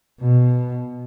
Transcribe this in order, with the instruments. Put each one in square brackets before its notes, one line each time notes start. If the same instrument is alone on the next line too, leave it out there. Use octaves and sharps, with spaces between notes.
[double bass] B2